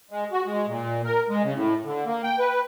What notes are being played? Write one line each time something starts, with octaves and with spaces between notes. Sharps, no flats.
G#3
F#4
G#3
A#2
A#4
G#3
C#3
A2
D3
A#3
G5
B4